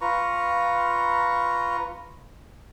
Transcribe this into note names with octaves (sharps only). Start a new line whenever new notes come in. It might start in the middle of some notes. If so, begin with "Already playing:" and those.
F4 B4 A#5 C#6